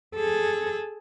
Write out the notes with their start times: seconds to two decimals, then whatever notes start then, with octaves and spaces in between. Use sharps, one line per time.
0.16 G#4 A4